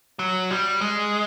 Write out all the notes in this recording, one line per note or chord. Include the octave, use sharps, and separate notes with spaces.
F#3
G3
G#3